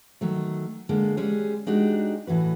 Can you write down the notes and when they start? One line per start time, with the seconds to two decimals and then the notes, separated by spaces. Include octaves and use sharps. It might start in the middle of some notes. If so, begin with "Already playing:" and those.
0.21 D#3 F#3 A3
0.89 D3 G#3 A#3
1.17 G3 G#3 C#4 G#4
1.67 G#3 D4 D#4 F#4 G4
2.27 A2 E3 F#4 B4